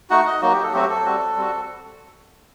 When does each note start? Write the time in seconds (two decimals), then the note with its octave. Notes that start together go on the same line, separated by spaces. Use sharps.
0.10 A3 D#4 F#4 F#5
0.26 D#5
0.41 F#3 A#3 D#4 F#4
0.52 G4
0.63 A4
0.73 F#3 A3 C4 F#4 G4
0.89 A4
1.05 G3 C4 F#4
1.37 G3 C4 F#4